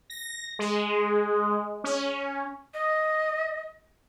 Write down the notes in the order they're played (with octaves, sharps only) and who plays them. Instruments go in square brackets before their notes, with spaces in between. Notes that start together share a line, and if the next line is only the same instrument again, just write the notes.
[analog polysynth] A#6
G#3
C#4
[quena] D#5